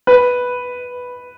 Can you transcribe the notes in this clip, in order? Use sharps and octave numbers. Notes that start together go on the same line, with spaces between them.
B4